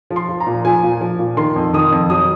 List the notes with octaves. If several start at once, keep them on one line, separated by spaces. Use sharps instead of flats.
F3
C6
F3
A#5
A#2
F3 G#5
A#2
F3
A#2
D#3 C6
F2
D#3 D#6
F2
F#3 D#6